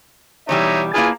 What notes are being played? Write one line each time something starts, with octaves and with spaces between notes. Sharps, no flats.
B2 E3 G3 D#4 C#5 E5
A#3 E4 F4 G#4 B4 A5